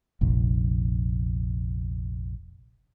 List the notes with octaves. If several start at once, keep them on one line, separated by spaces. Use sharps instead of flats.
F1 A#1